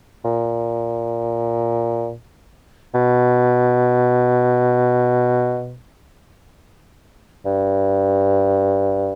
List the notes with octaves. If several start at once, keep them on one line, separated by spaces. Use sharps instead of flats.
A#2
B2
G2